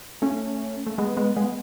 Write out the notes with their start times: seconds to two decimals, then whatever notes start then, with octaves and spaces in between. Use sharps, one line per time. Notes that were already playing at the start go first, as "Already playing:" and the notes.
0.22 A3 C#4
0.87 A3
0.98 G#3 B3
1.17 G#3 B3
1.37 G#3 B3